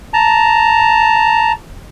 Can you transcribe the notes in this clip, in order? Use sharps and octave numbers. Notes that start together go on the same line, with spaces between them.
A5 A#5